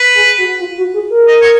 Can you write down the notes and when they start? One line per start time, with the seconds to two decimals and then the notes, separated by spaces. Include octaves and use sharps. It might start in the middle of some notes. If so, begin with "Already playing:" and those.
Already playing: B4
0.15 G#4
0.38 F#4
0.59 F4
0.77 F#4
0.94 G#4
1.10 A#4
1.28 D#5
1.42 C#5